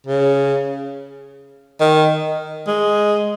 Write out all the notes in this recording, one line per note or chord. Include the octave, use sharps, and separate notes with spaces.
C#3
D#3
G#3